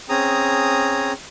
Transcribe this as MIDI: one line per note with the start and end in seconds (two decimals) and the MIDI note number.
0.09 1.13 60
0.09 1.13 61
0.09 1.13 68
0.09 1.13 82
0.09 1.13 87